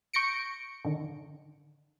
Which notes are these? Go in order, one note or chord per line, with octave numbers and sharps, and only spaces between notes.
C#6 G6 A#6 C#7 D7
D3 D#3